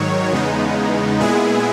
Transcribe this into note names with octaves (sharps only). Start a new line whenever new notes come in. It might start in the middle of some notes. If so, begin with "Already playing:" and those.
Already playing: G#2 D#3 F#3 C#5
E2 C#3 G#3 B3 D#4
A#2 G#3 B3 E4 G#4